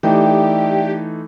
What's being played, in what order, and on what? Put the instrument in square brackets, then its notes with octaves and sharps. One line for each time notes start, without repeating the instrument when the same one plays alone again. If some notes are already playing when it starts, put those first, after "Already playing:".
[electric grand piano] E3 A3 D#4 [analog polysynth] G4 [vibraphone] D5 E5 G5